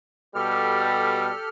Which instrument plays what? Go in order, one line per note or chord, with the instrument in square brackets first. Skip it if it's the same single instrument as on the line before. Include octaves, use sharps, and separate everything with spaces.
[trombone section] B2 G3 [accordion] G4 A4 F6